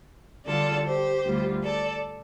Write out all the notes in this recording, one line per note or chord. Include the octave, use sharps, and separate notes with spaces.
D3 G3 F4 A4 D5
G4 C5
D2 D3 G3 F4
A4 D5